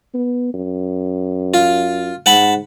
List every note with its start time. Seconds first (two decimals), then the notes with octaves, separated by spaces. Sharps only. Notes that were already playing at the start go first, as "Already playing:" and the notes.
0.14 B3
0.54 F#2
1.54 F4
2.26 G#2 F#5 A5 B5